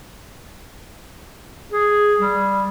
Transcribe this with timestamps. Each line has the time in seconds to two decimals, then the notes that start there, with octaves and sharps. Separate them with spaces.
1.72 G#4
2.20 G3